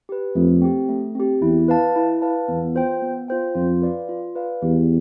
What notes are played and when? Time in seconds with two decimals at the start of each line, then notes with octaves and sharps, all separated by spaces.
0.09 G4 B4
0.35 F2 A3
0.62 C4 G4
0.89 A3
1.15 C4 G4
1.42 E2 E4
1.68 B4 F5 A5
1.96 E4
2.22 B4 F5 A5
2.48 E2 B3
2.75 F4 C5 G5
3.02 B3
3.28 F4 C5 G5
3.55 F2 F4
3.82 B4 D5 F5
4.09 F4
4.36 B4 D5 F5
4.62 E2 G4